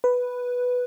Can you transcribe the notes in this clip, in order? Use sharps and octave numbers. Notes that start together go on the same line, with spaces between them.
B4